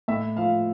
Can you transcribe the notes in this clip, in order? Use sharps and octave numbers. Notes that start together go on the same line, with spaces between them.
A2 E5
F3 F5